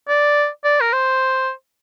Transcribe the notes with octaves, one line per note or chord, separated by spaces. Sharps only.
D5
D5
A#4
C5